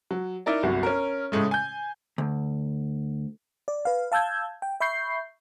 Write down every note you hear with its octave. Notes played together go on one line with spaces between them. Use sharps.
F#3
D#4 E4 A#4 D5
G1 C2 F#3 F#4
C#4 A#4
A2 C#3 G#3 A3
G#5 G6
D2
D5
B4 F5
F5 A5 E6 G6 G#6
G5
E5 B5 C#6 G6 C7